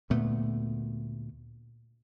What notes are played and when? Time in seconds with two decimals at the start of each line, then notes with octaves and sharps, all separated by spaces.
0.10 D2 A#2 A3 B3